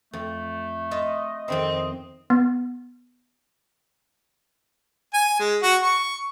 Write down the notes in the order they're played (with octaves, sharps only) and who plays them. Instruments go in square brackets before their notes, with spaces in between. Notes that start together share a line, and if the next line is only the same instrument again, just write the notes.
[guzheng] F2 [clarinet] A3
[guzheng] F4 E5 [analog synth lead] D#5
[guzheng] F2 D#3 E5 [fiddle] C4
[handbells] B3
[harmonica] G#5
G#3
F#4
C#6